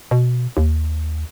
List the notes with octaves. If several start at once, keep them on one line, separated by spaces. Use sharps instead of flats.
B2
D#2